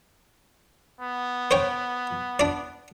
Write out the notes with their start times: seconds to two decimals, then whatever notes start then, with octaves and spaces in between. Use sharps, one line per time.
1.01 B3
1.51 C5 C#5 G5
2.39 D4 D5